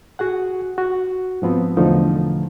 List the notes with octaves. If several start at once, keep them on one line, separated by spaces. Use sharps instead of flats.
F#4 G#4 F#5
F#4
G#2 F3 B3 C4
E2 B2 D3 F3 A3 D#4